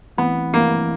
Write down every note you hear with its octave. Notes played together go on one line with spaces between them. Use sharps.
E3 A3 B3 C4 E4
E3 A3 A#3 C4 E4